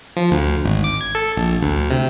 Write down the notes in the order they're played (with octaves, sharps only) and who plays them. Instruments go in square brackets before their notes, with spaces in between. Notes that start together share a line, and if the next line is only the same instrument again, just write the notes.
[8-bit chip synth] F3
D2
G#1
D6
G#6
A4
A#1
D2
C3